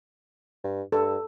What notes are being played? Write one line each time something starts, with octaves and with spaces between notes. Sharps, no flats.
G2
G2 A4